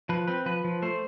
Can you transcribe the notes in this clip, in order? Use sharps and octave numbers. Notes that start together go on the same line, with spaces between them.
F3 B4
C4 B4
F3 B4
F3
A3 C5